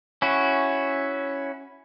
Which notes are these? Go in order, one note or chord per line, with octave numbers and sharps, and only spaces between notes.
C#4 E4 F#4